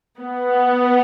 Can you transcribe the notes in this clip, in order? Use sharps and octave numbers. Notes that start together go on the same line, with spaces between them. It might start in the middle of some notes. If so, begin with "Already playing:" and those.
B3